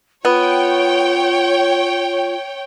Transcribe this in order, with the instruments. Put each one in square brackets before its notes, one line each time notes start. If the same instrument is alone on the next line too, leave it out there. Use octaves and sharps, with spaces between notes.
[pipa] B3 [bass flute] F4 [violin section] C#5 G5